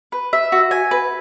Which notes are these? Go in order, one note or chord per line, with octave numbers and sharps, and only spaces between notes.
B4
E5
F#4
G#5
B4